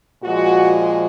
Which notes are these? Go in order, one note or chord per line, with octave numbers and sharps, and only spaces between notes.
A#2 F3 G#3 F#4
F#4